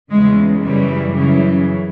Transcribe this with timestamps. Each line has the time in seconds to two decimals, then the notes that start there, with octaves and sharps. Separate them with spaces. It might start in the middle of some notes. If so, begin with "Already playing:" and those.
0.11 E2 C#3 E3 G#3
0.62 F#2 C#3 E3 G3
1.13 F#2 C#3 E3